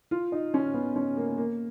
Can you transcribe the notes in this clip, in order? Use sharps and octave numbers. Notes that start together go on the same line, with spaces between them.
F4
D#4
C#4
B3
C#4
A#3
A#3